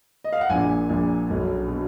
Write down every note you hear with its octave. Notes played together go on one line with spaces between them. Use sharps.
D#5
F5
F#5
A#1 A#2 G#5
A#1 A#2
B1 B2
B2